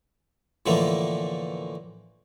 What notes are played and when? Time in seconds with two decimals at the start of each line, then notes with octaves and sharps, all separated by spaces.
0.66 A2 D3 E3 F3 A3 A#3